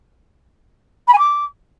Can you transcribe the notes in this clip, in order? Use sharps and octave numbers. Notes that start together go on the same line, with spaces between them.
B5
G#5
D6